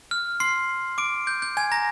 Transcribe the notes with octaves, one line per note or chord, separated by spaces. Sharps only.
F6
C6 C7
D6 D7
G6
G6
G#5 G#6
A#5 A#6